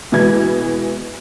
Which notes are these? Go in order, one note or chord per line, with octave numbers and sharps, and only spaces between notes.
B2 E3 G#3 E4 G#6